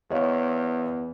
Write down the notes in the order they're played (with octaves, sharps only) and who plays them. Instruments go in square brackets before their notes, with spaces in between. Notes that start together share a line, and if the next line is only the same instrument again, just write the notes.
[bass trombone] E2 [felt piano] C#5 D#5 F5